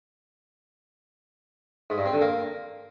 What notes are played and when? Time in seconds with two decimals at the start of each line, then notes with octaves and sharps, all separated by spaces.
1.90 G#2
1.98 G2
2.06 C4
2.13 D3
2.21 A#3